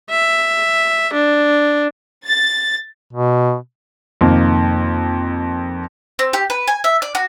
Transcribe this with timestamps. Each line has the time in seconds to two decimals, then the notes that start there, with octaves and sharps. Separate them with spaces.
0.10 E5
1.14 D4
2.25 A6
3.13 B2
4.21 F2 C3 D#3 A#3
6.19 C4
6.33 G4
6.50 B4
6.68 G#5
6.84 E5
7.02 D5
7.15 F#4